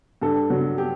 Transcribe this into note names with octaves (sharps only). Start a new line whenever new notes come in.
G2 A4
F#3
G4